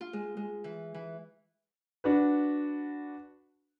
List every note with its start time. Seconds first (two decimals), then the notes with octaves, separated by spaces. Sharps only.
0.01 F4
0.13 G#3
0.37 G#3
0.64 E3
0.94 E3
2.04 D4 F#4 B4